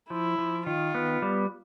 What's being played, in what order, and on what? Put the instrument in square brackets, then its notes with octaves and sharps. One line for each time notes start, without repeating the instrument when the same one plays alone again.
[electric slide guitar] F3 [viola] E4
[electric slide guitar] F3
[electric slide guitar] D#3 [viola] F4
[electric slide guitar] B3
G3